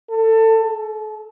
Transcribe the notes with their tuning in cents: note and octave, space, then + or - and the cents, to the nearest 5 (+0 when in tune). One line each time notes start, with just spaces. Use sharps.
A4 +25
A4 -40